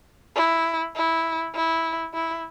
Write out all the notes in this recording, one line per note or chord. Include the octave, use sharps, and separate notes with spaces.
E4
E4
E4
E4